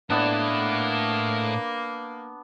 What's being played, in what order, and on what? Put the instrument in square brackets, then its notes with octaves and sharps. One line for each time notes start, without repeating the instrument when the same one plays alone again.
[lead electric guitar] A2 E4 [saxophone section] A#3 [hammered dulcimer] B3 D4